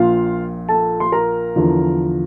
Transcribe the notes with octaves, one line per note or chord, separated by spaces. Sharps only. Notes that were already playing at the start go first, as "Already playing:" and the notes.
Already playing: A#1 A#2 F3 F4 F5
A4 A5
C6
A#4 A#5
E2 D3 F3